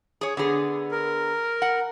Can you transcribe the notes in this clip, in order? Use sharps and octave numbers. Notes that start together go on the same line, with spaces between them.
G#4 C#5
D3 B3 G#4
A#4
F#5